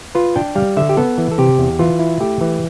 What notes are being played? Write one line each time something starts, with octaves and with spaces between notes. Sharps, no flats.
F4 B4
D4 G5
G3 F5
D3 E5
G4
B3 A4
E3
A4
C3 G4
E2
E3 F4
E4
A3 G4
E3